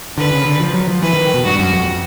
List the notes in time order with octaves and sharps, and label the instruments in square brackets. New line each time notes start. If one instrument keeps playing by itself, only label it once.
[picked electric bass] D3 [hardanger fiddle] B4
[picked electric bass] C#3
D3
F3
F#3
F3
[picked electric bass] E3 [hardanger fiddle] B4
[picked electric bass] D#3
B2
[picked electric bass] G2 [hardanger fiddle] F#4
[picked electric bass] F#2
F2